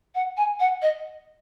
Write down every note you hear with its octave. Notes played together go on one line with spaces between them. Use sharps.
F#5
G#5
F#5
D#5